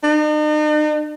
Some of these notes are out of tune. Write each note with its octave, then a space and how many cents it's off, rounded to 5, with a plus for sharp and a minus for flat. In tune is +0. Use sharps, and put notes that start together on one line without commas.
D#4 -45